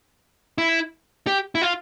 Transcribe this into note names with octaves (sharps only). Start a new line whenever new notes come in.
E4
G4
E4
F4